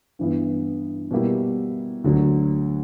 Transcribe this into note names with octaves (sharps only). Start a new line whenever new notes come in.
G2 E3 B3 E4
B2 G3 A#3 E4 G4
D2 D3 F#3